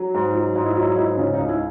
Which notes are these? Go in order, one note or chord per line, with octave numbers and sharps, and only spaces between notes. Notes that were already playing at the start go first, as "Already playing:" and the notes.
Already playing: F#3
G#2
F#3
G#2 D#4
E4
D#4
F#3 E4
D#4
G#2 E4
D#4
C#3 C#4
D#4
C#2
E4